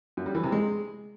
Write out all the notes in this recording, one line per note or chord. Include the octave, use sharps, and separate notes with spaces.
F#2
G3
E3
C3
G#3